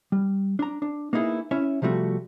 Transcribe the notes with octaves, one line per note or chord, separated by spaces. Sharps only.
G3
D4 A#5
D4
A#3 B3 D#4 E4 G#4
C#4 E4 C#5 E5
C3 F3 G3 A3 F#4